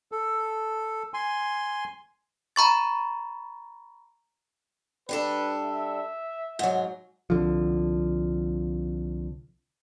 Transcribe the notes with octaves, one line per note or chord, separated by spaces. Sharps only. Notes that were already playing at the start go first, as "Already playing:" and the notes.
A4
G#5 C6
A#5 B5 C#6 A6
G3 D4 A4 B4
E5
G#2 F#3
C2 D3 F3